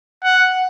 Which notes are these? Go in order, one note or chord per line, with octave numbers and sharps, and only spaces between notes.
F#5